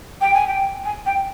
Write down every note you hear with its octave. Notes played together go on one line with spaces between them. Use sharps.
G5
G#5
G5
G#5
G5